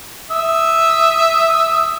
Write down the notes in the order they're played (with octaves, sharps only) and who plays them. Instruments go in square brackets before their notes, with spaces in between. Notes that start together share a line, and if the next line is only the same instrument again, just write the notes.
[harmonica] E5 D#6